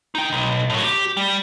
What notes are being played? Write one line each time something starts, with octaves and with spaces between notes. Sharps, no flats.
D#4 G5
B1
A2 F#3
G4
G3